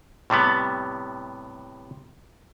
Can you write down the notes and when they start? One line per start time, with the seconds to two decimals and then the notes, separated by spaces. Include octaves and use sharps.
0.30 A2 C3 G3 B3